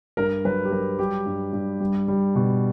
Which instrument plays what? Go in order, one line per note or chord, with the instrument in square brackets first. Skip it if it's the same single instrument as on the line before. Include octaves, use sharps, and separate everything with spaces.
[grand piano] G2 A#4
F#3 B4
G4
F#3 A#4
G3 G4
G2
G2
G3
G3
B2